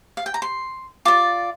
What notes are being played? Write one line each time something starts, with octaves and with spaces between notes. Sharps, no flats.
F5
G5
A#5
C6
F4 D5 D6